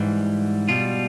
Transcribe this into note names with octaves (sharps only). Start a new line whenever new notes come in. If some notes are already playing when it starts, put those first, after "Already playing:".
Already playing: G#2 E3 G3
B2 G3 F4